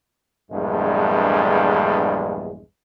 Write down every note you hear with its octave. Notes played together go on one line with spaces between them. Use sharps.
A#1 E2 G2 D3 G#3